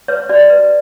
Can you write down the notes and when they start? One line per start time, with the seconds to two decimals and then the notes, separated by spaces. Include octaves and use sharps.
0.08 B4 C#5
0.29 F#4 D5
0.50 B4